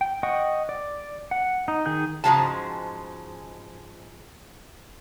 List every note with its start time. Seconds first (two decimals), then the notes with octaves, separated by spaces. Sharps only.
0.01 G5
0.23 D#5 F#5 G5 C#6
0.69 D5
1.31 F#5
1.68 D#4
1.86 D#3 G#4 G6
2.24 G#2 C#3 F3 G#3 F#4 A5